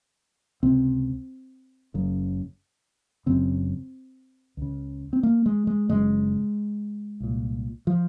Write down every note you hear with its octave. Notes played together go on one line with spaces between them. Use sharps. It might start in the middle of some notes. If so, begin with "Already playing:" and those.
C#2 C3 C4
F#1 F#2 C#3
F#1 F#2 C#3 C4
C#2 C#3
C4
A#3
G#3
G#3
F#1 F#2 C#3 G#3
C2 A#2
F3